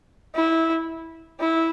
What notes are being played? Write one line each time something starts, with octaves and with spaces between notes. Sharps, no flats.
E4
E4